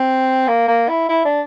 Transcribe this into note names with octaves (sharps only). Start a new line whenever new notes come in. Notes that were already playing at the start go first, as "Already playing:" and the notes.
Already playing: C4
A#3
A#3
E4
E4
D4